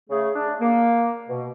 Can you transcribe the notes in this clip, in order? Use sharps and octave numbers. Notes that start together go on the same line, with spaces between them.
C#3 A3 G#4
D4
A#3
B2